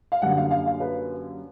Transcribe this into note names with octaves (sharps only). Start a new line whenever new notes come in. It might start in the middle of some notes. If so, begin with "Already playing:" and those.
F5
F#2 D3 G3 A#3 F#5
F5
F5
F5
B4